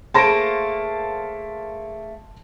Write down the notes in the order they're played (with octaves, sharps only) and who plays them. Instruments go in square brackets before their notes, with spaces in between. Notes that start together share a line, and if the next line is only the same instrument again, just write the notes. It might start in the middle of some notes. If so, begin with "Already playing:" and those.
[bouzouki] A3 A#3 C5 [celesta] G#4 D7 [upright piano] A5 C6 A#6